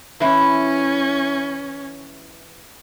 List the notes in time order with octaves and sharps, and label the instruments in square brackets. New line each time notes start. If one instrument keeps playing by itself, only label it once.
[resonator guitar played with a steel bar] E3 E4 [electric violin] C#4